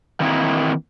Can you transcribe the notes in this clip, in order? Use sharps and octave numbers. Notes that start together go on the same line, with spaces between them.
D#3 E3 A#3 C4 D#4 E4